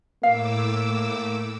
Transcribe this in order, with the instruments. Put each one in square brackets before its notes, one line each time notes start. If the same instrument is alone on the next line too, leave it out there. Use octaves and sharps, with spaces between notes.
[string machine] A2 D6 E6 [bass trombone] A#3 [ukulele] F5